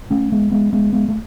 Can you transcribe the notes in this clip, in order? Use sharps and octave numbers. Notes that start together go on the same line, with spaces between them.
A3 C#4
G#3 B3
G#3 B3
G#3 B3
G#3 B3
A3